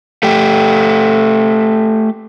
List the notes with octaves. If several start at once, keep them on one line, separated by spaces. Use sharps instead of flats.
A3 G4